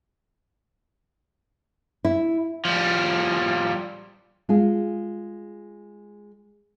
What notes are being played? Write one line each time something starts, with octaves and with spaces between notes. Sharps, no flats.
E4
F3 G3
G#3 F4 G#4